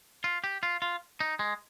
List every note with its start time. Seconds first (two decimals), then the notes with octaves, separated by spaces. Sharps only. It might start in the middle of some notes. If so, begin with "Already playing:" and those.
0.24 F4
0.44 G4
0.63 F4
0.82 F4
1.20 D#4
1.39 G#3